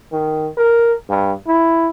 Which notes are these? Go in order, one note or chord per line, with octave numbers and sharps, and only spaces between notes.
D#3
A#4
G2
E4